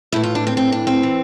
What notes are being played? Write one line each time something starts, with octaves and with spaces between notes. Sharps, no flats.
A2 E3 E4
F4
D4
C4
C4
D4
C4
E3